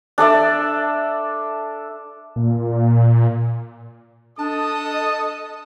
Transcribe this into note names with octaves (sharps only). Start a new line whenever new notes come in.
D4 A4 D5 E5
A#2
D4 A4 D#5 A5 D#6